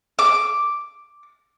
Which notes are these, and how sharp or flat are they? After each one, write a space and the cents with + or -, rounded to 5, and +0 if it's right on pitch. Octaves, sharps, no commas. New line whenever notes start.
D6 +0